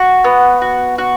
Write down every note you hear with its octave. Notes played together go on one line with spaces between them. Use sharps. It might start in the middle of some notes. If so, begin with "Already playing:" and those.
Already playing: F#4
B3
F#4
F#4